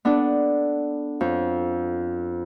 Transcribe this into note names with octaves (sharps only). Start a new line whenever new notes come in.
B3 D4 A4
F2